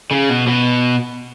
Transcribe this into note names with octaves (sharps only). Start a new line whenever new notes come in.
C#3
B2
B2